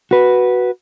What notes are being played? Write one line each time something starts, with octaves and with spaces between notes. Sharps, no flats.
F#4 B4